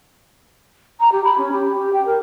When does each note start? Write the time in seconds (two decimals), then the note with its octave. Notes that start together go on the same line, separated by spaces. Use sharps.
1.00 A#5
1.12 G4
1.25 B5
1.38 C#4
1.52 G4
1.77 G4
1.93 G5
2.06 A#4